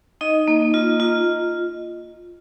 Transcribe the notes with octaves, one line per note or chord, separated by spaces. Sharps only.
D#4 D#5
A#3
F4
F4